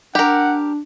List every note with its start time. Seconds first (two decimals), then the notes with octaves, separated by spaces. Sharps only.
0.15 D4 G4 A#4 F#5